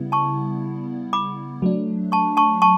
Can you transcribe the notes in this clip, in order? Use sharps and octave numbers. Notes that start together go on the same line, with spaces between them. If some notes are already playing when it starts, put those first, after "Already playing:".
Already playing: C#3 G3 B3 E4
A5 C#6
B5 D6
F#3 A3 D4
A5 C#6
A5 C#6
A5 C#6